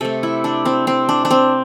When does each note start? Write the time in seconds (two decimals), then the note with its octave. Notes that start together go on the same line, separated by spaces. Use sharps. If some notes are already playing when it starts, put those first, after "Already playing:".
0.01 C3 A3 A4
0.23 E4
0.44 D4
0.65 C4
0.87 C4
1.09 D4
1.25 D4
1.31 C4